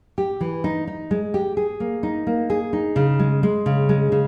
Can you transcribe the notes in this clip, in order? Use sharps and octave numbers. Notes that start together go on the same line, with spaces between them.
G4
E3
D#4
D#4
G#3
G4
G#4
A#3
D#4
A#3
G#4
D#4
C#3
G#3
G#3
C#3
G#3
C#3